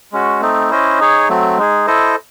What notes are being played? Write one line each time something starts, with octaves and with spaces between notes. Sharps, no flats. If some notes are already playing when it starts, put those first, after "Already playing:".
G#3 C#4 F#4
A3 C4 D#4
C#4 E4 C5 D#5
D#4 G#4 C#5
F#3 A3 C4
G#3 D#4 G#4
E4 A4 C5 D#5